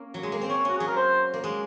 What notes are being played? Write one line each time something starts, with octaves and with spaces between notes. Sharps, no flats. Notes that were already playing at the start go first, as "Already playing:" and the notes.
Already playing: A#3 C#4
F#3
G#3
A#3
C4
C#4 C#5
C#4 F#4
F#3 G#4
A#4
C5
A#3
G#3